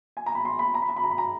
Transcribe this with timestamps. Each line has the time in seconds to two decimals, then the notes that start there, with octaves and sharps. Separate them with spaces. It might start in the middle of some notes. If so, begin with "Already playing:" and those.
0.17 G#5
0.26 A#5
0.35 B5
0.45 C6
0.59 B5
0.74 A#5
0.82 B5
0.89 A#5
0.96 B5
1.04 A#5
1.11 B5
1.18 A#5